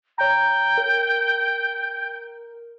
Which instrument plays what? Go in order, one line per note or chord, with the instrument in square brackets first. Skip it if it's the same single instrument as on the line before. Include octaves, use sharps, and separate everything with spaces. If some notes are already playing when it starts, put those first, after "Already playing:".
[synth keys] C#5 A#5 [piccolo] G5
[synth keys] A#4